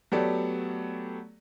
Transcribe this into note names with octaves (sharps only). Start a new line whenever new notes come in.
F#3 A3 B3 G4 A4 D5